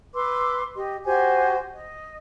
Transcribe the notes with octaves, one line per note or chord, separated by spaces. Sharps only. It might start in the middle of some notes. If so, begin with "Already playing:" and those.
B4 C6 D6 E6
G4 D#5
F#4 G4 C5 G#5
D#5